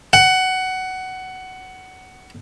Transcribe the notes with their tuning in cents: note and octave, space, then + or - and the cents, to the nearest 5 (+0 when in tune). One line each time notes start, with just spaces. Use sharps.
F#5 +15